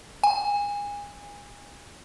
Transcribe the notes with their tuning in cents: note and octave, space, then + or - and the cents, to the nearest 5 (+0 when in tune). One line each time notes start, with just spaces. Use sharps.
G#5 -25